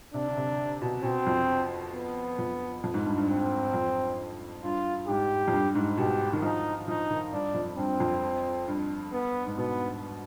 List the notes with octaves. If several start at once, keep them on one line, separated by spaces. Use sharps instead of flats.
C3 D4
D3
C3
B2
B2 C4
F2
B3
F2
F2
G#2
G2
G2
C4
F2
G2 F4
G#2 G4
F2
G2
G#2
B2 G4
D#3
F3 D#4
F3 D#4
D#3
G2 D4
F2
G2 C4
F2
G2
B3
G#2
B2 B3